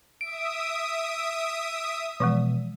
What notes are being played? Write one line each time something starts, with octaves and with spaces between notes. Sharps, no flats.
E5 D#6 D7
B2 E3 F3 G#3